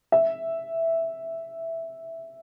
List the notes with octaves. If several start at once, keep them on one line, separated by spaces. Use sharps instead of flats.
E5